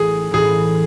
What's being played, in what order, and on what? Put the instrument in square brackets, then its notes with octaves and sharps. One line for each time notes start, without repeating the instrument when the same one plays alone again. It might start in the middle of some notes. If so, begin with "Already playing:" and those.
Already playing: [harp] A1 A2 E3 A3 [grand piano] G#4
[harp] A1 A2 E3 A3 [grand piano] G#4